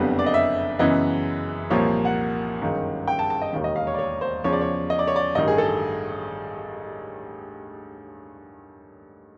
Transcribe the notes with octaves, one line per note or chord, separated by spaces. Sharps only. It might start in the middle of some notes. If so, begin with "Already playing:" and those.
Already playing: F#1 F2 D3 G3 B3
D5
D#5
E5
F#2 C#3 E3 G#3 B3 D#5
C2 A#2 F3 A#3 C#5
F#5
G1 F#2 D#3 G#3
G5
A5
A5
D#5
E1 D#2 D#3
D#5
F5
C#5
D5
C#5
C5
E2 C#3 F3 C#5
D5
C#5
D#5
D5
C#5
D5
A1 G2 D#3 D#5
G#4
A4